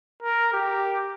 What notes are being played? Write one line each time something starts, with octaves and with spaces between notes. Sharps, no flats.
A#4
G4